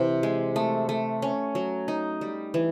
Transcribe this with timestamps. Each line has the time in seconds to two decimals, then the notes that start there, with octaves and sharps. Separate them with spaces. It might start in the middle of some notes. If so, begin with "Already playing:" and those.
Already playing: C3 E3
0.23 G#3
0.56 A3
0.89 A3
1.22 C#4
1.55 F#3
1.88 D#4
2.21 G3
2.54 E3